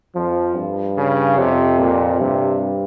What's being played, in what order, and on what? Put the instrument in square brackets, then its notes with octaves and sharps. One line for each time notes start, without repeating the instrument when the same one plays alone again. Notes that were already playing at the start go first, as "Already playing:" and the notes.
[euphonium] F2 [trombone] F3
[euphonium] G2
[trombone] C#3
[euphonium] F2 [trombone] C3
[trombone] A#2
[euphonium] G2 [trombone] C3